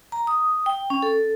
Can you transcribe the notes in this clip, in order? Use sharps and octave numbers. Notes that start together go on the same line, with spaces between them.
A#5
D#6
G5
C#4
A4